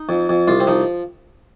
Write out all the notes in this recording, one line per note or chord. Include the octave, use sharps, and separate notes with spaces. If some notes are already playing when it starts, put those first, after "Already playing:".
Already playing: D#4
F2
F2
C2 F4
C4
F3 D#4